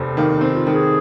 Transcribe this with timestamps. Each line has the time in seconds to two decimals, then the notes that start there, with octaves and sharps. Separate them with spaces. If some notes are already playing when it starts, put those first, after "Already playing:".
Already playing: F1 D#2 C4
0.16 D#3 A#3
0.35 D#4
0.41 C4
0.54 F4
0.67 D#3
0.73 G#4